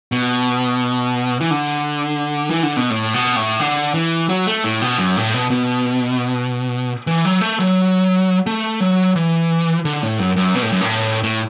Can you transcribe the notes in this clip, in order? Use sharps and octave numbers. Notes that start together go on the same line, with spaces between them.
B2
E3
D3
E3
D3
B2
A2
B2
A2
D3
E3
F#3
A3
A2
B2
F#2
A2
B2
B2
E3
F#3
A3
F#3
A3
F#3
E3
D3
A2
F#2
F#2
B2
A2
F#2
A2
A2